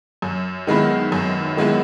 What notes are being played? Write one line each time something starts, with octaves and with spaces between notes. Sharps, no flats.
F#2
D#3 G#3 B3 E4
F#2
D#3 G#3 B3 E4